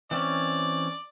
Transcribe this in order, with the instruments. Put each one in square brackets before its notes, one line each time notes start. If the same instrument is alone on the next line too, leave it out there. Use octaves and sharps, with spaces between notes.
[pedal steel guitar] E3 C4 C#4 [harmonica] D5